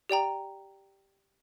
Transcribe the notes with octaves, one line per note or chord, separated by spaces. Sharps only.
G4 D5 G5 A#5